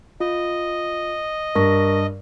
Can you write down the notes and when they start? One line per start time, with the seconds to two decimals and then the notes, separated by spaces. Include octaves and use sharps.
0.20 F4 D#5
1.55 G2 A#4 C#6 A#6